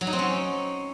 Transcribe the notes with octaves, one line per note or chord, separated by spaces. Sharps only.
F#3
D#4
C4
C#4